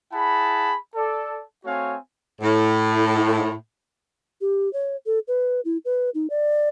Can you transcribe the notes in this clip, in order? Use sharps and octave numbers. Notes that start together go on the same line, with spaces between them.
E4 G#4 F#5 A5 B5
A4 D5
A3 C4 F#4 C#5 F5 G#5
A2
G4
C#5
A4
B4
E4
B4
D#4
D5